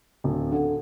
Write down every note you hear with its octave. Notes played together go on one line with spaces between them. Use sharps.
D1
D3